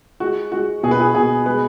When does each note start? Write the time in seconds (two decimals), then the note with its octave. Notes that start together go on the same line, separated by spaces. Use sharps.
0.20 G#3 F#4
0.52 G#3 F#4
0.83 B2 G#4
0.91 B4
1.00 G#4
1.15 B2 G#4
1.46 G#3 B4